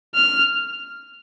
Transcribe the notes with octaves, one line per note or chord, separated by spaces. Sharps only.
F6